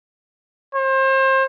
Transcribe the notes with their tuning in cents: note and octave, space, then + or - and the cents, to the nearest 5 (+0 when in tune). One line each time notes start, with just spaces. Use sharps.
C5 +30